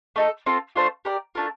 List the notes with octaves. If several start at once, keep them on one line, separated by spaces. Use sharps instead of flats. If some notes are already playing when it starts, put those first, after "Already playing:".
A3 D#4 A4
C4 F4 A4
A3 D4 F4 C5
G4 A#4 D5
A3 D4 F4 A#4